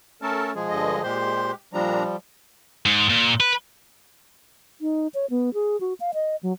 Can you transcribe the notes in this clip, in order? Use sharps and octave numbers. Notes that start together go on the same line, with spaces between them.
A3 C#4 A4 A#4 A5
B2 F3 G#3 G#4
G2 D3 D#5
A#2 G#3 G4 C5 C6
A#2 F3 G3 D4 A#5
G#2
A#2
B4
D#4
C#5
B3
G#4
F#4
F5
D#5
F#3